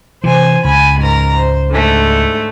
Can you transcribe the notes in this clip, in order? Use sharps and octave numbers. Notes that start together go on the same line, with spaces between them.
C3 E3 C5 G#5
C#2 G#5 B5
G#2 A#4 A#5
C5
G#2 D3 A3